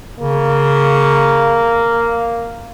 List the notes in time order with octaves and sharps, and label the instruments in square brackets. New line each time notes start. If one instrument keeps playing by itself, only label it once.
[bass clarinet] C#3 [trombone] A#3